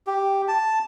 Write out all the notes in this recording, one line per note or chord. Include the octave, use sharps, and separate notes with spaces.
G4
A5